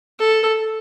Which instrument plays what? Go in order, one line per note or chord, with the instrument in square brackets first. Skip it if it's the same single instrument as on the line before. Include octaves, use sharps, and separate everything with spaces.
[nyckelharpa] A4